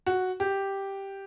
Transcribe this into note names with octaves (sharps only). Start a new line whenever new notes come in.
F#4
G4